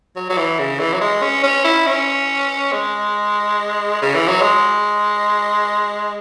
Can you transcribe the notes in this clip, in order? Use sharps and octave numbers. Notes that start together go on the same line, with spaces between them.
F#3
F#3
E3
C#3
E3
F#3
G#3
C#4
C#4
E4
C#4
G#3
C#3
E3
F#3
G#3